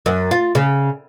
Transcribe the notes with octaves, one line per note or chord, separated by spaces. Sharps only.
F#2
F4
C#3